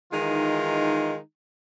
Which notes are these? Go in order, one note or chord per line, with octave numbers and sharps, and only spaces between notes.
D#3 E3 G#3 D#4 F4